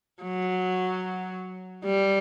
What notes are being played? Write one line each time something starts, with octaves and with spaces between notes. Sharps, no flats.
F#3
G3